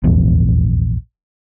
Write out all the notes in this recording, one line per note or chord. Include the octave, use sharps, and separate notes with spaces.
D#1 A#1 E2 G#2